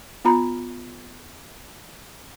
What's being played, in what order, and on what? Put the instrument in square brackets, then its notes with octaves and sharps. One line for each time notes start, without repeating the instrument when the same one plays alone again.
[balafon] B3 F4 A#5 B5